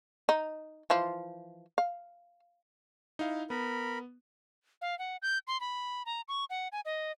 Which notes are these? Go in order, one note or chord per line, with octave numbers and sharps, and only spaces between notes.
D#4
E3 F3 F4
F5
D#4 E4 F5
B3 A#4 B5
F5
F#5
G6
C6
B5
A#5
C#6
F#5
G#5
D#5